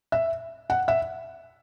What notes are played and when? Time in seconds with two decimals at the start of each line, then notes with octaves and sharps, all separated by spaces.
0.12 E5
0.70 F#5
0.88 E5